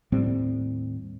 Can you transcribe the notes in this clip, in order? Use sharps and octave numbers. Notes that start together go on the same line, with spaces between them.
D#2 A2 G3 C4